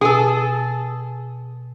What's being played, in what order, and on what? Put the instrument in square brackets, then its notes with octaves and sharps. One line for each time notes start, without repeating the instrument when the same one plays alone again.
[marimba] B2 [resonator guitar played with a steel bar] G#4 A4